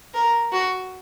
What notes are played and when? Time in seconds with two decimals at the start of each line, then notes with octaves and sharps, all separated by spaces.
0.14 A#4
0.52 F#4